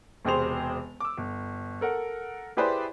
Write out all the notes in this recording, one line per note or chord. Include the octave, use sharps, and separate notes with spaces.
E1 C3 C4 G#4 C5 F7
D6 E6
G1
A4 A#4 F#5
E4 G4 G#4 B4 C5 D5